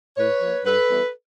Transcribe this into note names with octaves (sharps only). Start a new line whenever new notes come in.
A2 B4 C#5
F3 A#3
G2 A4 B4
E3 G3 B3 E4